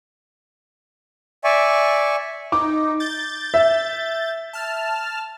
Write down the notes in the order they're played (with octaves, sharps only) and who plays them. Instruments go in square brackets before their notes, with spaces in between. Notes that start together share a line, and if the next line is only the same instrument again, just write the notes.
[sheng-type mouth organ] D5 E5 G#5 C#6
[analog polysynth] D#4 [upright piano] D6
[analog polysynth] G6 A6
[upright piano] E5
[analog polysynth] A5 F6